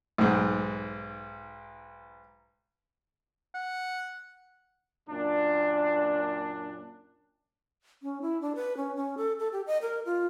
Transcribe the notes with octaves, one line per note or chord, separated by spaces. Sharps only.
B1 G#2
F#5
F#2 A#2 D4
C#4
E4
D4
B4
C#4
C#4
A4
A4
G4
D#5
A#4
F4